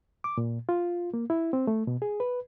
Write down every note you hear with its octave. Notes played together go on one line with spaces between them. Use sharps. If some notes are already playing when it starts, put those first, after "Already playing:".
D6
A#2
F4
A#3
E4
C4
A3
B2
G#4
B4